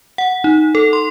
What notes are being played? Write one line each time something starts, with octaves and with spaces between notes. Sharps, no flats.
F#5
D#4
A4
C6